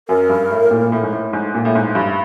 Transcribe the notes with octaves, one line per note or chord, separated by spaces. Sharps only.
F#2 A#4
G2
A2
A#2
A2
G#2
A2
G#2
A#2
A2
G#2
G2